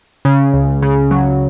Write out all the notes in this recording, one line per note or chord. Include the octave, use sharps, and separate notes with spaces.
C#3
C#2
C#3
F#3